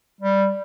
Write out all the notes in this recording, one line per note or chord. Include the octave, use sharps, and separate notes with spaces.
G3